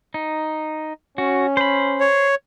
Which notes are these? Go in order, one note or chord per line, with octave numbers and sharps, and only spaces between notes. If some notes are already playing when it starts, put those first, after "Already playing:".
D#4
C#4 F#4
C5 B5
C#5